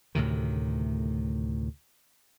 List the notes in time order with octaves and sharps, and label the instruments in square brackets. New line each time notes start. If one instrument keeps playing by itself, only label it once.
[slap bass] D2 A2 C3 D#3